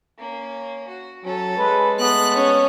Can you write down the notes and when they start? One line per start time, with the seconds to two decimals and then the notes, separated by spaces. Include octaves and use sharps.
0.18 A#3 C#4
0.88 F#4
1.24 F#3 C#4 A4
1.58 G#3 B4
2.00 A3 B3 F#6
2.34 C#4